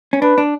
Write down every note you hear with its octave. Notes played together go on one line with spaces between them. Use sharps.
C#4
D4 B4
D4